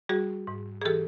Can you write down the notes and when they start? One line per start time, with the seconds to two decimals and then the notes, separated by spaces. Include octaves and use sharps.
0.09 G3 F#4 G#4
0.47 G#2
0.82 G#4
0.85 E3 G4 A4